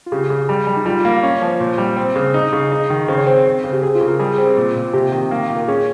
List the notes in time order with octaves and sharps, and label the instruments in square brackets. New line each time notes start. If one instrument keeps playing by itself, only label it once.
[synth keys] F4
[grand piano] C#3 [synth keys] G4
[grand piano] C#3
G3
G3
[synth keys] D#4
[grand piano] G3 [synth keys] F4
[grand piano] A#3
C#4
F3
[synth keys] C#5
[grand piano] A#2 [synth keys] C5
[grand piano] G3
C4
C#3
D#4
C#3
D#4
D#3
[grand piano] C#3 [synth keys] C5
[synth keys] C#5
[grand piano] C4 [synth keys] C5
[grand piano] C4
C#3
[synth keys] G4
[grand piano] C4 [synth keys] G#4
[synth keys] F4
[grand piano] C#3
[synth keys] A#4
[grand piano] G3 [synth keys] G#4
[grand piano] C4
A#2
A#2
[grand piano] C3 [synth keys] G4
[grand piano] D#3
A#3
A#2
[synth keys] A#4
[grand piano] C#4 [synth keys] G#4